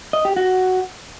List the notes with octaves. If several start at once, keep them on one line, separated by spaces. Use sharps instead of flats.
D#5
G4
F#4